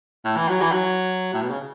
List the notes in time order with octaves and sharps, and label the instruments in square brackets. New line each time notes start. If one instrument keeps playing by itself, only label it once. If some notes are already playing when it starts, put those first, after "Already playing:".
[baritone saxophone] A2
E3
F#3
E3
F#3
A2
B2
C#3